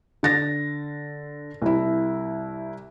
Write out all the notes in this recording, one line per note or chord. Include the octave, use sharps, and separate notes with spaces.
D3 A6 A#6
C2 E4